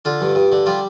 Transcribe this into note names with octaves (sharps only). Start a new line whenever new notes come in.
D3 F4
G2
G2
D3
G3 F4